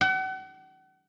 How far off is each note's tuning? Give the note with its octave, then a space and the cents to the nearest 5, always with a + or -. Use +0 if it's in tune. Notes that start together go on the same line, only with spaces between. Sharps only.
F#5 +40